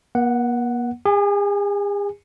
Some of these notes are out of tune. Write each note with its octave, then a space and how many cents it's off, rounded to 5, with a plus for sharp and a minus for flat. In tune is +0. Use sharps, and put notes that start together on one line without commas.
A#3 +45 F#5 +0
G#4 -45 G#5 +0